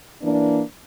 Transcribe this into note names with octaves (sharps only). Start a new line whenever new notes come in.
E3 A#3 D4